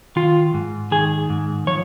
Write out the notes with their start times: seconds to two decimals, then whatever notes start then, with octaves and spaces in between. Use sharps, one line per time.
0.16 D#3 F4
0.54 G#2
0.91 D#3 G#4
1.30 G#2
1.67 F3 C#5